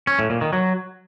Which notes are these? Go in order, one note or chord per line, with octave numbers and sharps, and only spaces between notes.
C#4
A2
A#2
D#3
F#3